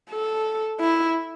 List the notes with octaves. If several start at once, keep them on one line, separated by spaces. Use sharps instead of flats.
A4
E4